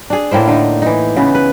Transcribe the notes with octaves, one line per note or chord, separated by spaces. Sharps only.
D4 G#4
A2 A#3 E4 C5
D3 D#4
E3 D#4
C#3 B3
B4